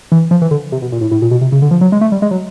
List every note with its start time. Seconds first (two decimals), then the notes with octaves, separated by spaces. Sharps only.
0.12 E3
0.31 F3
0.42 E3
0.51 D3
0.72 C3
0.82 B2
0.92 A#2
1.01 A2
1.11 A2
1.22 A#2
1.31 B2
1.41 C3
1.52 C#3
1.62 D3
1.71 F3
1.81 F#3
1.92 G#3
2.01 A3
2.12 G3
2.22 G#3
2.31 F#3